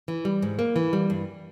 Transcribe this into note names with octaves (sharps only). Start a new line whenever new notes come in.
E3
G3
G#2
A#3
E3
G3
G2